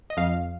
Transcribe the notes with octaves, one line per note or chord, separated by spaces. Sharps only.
D#5
F2 F5